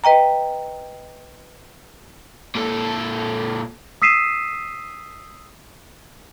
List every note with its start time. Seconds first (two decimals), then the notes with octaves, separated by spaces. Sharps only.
0.04 B4 D#5 G5 A#5
2.55 A#2 A4
4.02 D#6 E6 B6 C7 D#7 E7